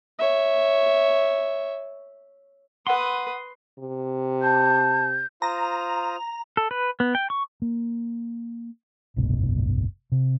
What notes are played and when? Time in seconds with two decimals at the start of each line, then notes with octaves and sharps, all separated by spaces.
0.19 C#5 E5
2.87 B4 F#5 C6 D#6 E6
3.79 C3
4.42 A5 G6
5.42 F4 C5 A#5 D#6
6.57 A4
6.71 B4
7.00 B3
7.15 G5
7.30 C#6
7.62 A#3
9.16 F#1 C2 G#2 B2
10.12 C3